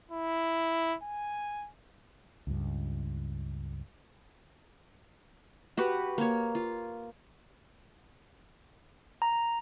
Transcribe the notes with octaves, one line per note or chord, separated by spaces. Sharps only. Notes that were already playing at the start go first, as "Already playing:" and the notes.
E4
G#5
C#2 G2
F#4 G4 B4 F#5
A#3 C#5
F4
A#5